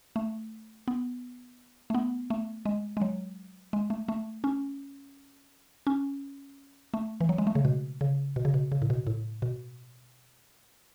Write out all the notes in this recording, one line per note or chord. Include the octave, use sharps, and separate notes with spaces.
A3
B3
A3
B3
A3
G#3
G#3
F#3
G#3
A3
A3
C#4
C#4
A3
E3
F#3
G#3
A3
C#3
B2
C#3
B2
C#3
B2
C#3
A2
B2
A2
B2